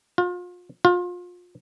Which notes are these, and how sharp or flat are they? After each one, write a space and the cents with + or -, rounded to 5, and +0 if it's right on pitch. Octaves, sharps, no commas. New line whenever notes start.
F4 +35
F4 +30